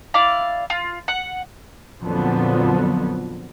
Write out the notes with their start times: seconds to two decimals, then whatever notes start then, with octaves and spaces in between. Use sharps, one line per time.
0.14 E4 D5 F5 D6
0.70 F4
1.08 F#5
2.02 F2 A#2 D3 F3 F#3 B3